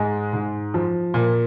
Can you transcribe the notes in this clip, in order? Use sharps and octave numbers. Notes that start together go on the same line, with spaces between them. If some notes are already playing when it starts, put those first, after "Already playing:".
Already playing: G#2 G#3
G#2
F3
A#2